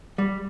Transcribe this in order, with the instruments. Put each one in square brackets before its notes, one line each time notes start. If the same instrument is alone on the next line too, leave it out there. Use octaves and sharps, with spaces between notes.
[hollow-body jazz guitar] G3